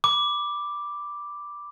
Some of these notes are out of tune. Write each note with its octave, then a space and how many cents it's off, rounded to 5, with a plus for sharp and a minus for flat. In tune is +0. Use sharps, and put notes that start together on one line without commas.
B5 +0 D6 +0